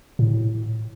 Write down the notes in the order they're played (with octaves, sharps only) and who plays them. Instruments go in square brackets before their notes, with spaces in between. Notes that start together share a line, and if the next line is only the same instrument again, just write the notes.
[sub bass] A2